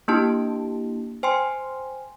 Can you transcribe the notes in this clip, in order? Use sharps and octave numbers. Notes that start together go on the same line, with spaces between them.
A#3 D4 E4 G4 A5
C5 G5 G#5 C6